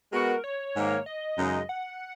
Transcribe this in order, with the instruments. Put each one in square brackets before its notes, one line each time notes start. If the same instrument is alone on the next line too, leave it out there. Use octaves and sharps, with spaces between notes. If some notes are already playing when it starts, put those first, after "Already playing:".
[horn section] G#3 B3 F#4 [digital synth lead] A#4
[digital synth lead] C#5
[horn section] G#2 D#3 A#3
[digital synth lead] D#5
[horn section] F#2 C#3 G#3 D#4 G#4
[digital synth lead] F#5